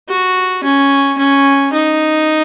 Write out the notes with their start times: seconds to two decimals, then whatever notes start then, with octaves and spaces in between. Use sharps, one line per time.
0.09 F#4
0.64 C#4
1.18 C#4
1.73 D#4